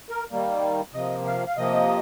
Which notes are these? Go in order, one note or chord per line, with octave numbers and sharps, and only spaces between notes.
A#4
D#3 G3 A#3
C3 F3 A#3 D#5
F5
F5
C3 F3 A#3 D#5